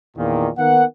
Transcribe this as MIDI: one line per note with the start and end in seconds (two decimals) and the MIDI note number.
0.17 0.48 40
0.17 0.48 46
0.17 0.48 51
0.58 0.84 51
0.58 0.84 58
0.58 0.84 59
0.58 0.84 78